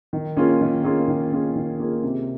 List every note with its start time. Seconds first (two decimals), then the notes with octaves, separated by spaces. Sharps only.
0.13 D#3
0.37 A#3 C#4 F4 G#4
0.61 D#3
0.84 A#3 C#4 F4 G#4
1.08 D#3
1.32 A#3 C#4 F4 G#4
1.56 D#3
1.80 A#3 C#4 F4 G#4
2.03 C3